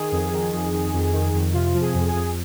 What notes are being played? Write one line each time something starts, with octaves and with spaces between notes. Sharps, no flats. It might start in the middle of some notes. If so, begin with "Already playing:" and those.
Already playing: D#3 G#4
F2
D#3
F2
D#3
F2
D#3
F2
C3 F4
F3
G#4
F2
G#4
F2